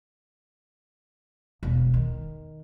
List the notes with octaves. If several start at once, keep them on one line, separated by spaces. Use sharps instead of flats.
E1
D#3